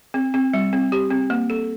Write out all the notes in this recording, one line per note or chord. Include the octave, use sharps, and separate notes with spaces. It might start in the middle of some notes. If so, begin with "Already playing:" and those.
C4
C4
G3
C4
G4
C4
A#3
A4